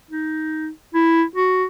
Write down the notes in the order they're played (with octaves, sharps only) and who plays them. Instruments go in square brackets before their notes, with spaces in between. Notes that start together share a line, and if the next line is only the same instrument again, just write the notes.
[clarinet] D#4
E4
F#4